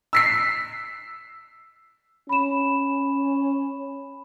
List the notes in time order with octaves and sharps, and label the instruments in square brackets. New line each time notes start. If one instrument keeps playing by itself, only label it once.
[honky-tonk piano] E6 B6 C7
[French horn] C#4 [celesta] B5 E7